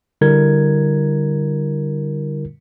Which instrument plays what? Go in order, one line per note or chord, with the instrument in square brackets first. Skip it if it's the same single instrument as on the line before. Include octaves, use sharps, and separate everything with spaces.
[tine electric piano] D3 G3 E4 A#4 G#6